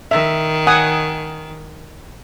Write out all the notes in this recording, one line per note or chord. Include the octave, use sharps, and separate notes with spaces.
D#3 E5
F#5 G#5 D#6